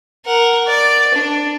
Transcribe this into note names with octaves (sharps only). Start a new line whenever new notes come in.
A#4 F#5
D5
D4